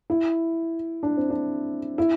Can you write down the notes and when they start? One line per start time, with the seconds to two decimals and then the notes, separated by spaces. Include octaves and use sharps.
0.10 E4
1.03 D4
1.17 C4
1.30 D4
1.98 E4